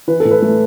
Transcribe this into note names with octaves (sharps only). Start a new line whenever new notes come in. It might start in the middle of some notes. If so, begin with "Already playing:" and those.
E3 B4
A4
A2
B4
A3